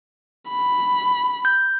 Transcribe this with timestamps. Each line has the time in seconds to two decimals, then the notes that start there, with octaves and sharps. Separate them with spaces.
0.49 B5
1.45 G6